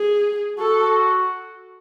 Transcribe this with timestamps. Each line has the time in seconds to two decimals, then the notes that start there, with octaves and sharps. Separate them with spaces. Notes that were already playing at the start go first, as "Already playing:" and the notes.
Already playing: G#4
0.59 F#4 A4